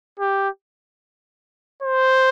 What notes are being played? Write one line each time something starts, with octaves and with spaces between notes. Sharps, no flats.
G4
C5